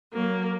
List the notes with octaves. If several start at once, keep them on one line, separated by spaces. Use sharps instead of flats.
F#3 A#3